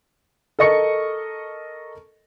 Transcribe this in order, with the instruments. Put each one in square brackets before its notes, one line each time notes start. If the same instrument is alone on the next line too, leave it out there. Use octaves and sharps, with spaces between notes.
[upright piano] A4 A#4 D#5 C#6 C#7